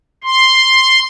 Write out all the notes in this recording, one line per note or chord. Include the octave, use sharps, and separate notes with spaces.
C6